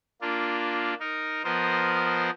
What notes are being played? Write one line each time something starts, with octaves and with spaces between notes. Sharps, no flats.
A#3 D4 F4
D#4 A#4
F3 B3 A#4 C5 D#5